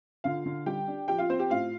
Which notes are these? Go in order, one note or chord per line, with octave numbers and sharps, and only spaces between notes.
D3 F4 F5
D3
G3 G4 G5
D4
F3 G4 G5
F4 F5
C4 C5
G4
A2 F4 F5